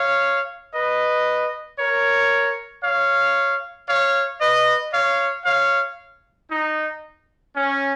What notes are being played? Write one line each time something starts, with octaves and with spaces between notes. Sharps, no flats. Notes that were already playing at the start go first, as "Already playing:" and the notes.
Already playing: C#5 F5
B4 D#5
A#4 C#5
C#5 F5
C#5 F5
B4 D#5
C#5 F5
C#5 F5
D#4
C#4